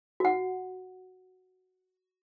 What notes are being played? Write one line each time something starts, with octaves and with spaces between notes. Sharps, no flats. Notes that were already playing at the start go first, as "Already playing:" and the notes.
F#4 F#5